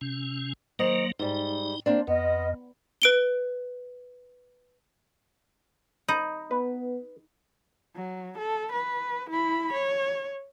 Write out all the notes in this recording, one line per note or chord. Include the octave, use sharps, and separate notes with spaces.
C3 C#4
D#3 F#3 A#3 C5 D#5
G#2 G3 D#4
A#3 C4 D4
F2 B3 D#5
B4 D7 G7
D#4 B5 G6 D#7
B3 B4
F#3
A4
B4
E4 B5
C#5